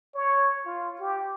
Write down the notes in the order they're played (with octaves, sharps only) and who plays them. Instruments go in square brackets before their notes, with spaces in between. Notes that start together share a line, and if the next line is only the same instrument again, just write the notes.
[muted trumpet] C#5
F4
G4